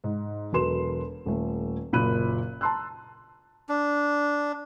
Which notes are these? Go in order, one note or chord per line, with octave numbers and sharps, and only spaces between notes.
G#2
E1 F#3 A4 B4 C6 E7
D#1 A3
F#1 A#2 B5 F#6 D#7
A5 A#5 C6 E6 F#6
D4